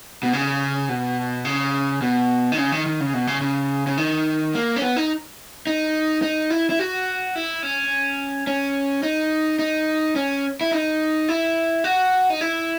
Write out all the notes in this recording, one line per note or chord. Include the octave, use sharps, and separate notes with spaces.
B2
C#3
B2
C#3
B2
D#3
C#3
D#3
D#3
C#3
B2
C#3
C#3
C#3
D#3
A#3
C#4
B3
D#4
D#4
D#4
E4
E4
F#4
E4
C#4
C#4
D#4
D#4
C#4
E4
D#4
E4
F#4
D#4
E4